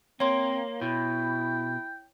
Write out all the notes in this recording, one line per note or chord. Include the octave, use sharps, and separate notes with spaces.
A#3 C4 C#5 C6
B2 E4 G5